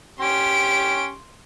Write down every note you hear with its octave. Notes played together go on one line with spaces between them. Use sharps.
C#4 G4 C6 C#6 D7